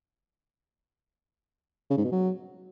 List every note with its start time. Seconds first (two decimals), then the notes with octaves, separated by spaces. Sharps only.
1.90 C#3
1.97 G#2
2.05 B2
2.12 F#3